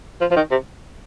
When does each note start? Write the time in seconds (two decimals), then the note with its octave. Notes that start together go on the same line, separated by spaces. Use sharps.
0.21 F3
0.31 F3
0.36 D#3
0.51 C3